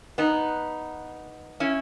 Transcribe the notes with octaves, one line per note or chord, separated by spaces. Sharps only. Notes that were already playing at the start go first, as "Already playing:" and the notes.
B3 D#4
C#4 E4